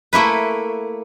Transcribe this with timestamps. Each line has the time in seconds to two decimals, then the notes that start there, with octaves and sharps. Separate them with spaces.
0.13 A3 A#3 E4 B4